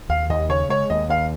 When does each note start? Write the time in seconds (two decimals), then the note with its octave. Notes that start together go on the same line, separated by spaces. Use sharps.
0.09 D#2 F5
0.29 D#2 D#5
0.49 C#3 C#5
0.69 G#3 C#5
0.90 D#2 D#5
1.09 D#2 F5